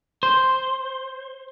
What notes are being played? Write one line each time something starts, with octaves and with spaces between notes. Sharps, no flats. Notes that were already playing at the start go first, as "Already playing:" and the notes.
C5